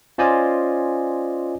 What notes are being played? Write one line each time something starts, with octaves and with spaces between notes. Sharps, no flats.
C#4 F4 C5 D5 D#5 G#5